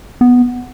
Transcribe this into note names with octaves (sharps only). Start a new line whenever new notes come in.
B3